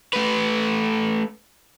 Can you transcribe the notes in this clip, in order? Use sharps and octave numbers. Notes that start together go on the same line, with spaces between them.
A3 B4